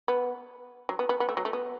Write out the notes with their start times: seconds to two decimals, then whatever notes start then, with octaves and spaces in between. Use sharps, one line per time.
0.08 B3
0.89 F#3
0.99 B3
1.09 B3
1.20 B3
1.29 A3
1.37 F#3
1.45 A3
1.53 B3